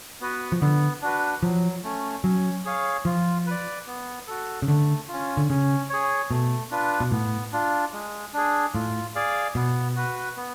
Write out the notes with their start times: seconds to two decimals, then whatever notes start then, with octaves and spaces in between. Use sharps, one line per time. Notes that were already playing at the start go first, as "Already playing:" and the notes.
0.21 B3 F#4 B4
0.52 F3
0.61 D3 B3
1.02 D4 F#4 B4
1.43 F3 F#3
1.83 A3 C#4
2.24 F#3 C#4
2.65 G#4 C#5 F5
3.05 F3 F4
3.47 B4 D5
3.87 B3
4.27 F#4 A4
4.62 C#3
4.68 D3 A3
5.08 F4
5.13 C#4
5.37 D3
5.50 C#3 C#4
5.90 G#4 C#5
6.31 B2 A3
6.71 D4 F4 B4
7.00 B2
7.12 A2 B3
7.52 D4 F4
7.93 G#3
8.33 D4 G#4
8.74 A2 F4
9.15 G#4 D5 F5
9.55 B2 B3
9.96 F#4 B4
10.36 B3